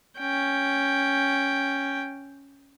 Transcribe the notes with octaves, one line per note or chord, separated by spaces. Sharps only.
C#4 G5